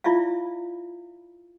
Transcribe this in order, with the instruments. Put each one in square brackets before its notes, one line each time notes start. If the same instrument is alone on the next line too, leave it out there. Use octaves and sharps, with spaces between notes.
[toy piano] E4 F4 D5 E5 F5